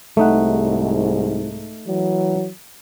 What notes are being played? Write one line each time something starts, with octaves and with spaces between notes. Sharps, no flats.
C2 G#2 A3 D#4 F#5
E3 F#3